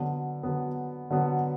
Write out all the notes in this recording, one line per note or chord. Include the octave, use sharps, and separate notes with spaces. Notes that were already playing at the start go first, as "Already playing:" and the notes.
Already playing: D3 F#3 B3
D3 F#3 B3
D3 F#3 B3